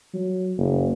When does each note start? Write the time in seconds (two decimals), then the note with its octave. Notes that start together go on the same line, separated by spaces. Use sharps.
0.14 F#3
0.58 F#1